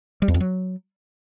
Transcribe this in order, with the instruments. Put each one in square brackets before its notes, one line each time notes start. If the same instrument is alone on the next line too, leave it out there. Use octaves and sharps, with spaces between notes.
[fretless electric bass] G3
E2
F2
F#3